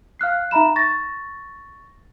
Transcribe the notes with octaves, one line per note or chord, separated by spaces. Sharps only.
F5 F6 F#6 C7
D#4 E5 A#5 B5 E7
C#6 A6 A#6